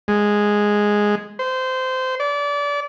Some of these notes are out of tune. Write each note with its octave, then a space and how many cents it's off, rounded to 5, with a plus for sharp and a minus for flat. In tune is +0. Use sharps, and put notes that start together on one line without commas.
G#3 -5
C5 -20
D5 -30